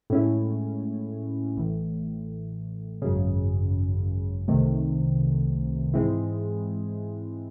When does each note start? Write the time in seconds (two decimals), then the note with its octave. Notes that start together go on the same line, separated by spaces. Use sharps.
0.10 A2 G#3 C#4 E4
1.55 A1 A2 E3
3.02 G#1 F#2 C#3
4.48 C2 C3 D#3 A3
5.94 G#2 E3 G#3 C4 E4